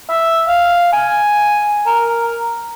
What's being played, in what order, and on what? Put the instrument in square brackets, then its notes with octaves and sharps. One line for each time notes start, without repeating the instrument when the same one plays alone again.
[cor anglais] E5
F5
G#5
A#4